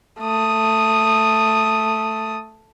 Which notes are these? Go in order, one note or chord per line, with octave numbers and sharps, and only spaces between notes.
A3 D#6